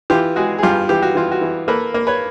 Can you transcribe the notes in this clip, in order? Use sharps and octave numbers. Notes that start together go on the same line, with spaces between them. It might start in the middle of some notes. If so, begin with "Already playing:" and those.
E3 F4 G4
G#3 F#4 G#4
G#4
G2 F4 G4
E3 G4
F#4
E3 F4
F#4
E3
A#3 A4 B4
A#3
B4 C#5